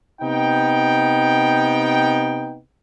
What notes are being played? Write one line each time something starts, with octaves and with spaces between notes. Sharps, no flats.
C3 B3 D#4 G5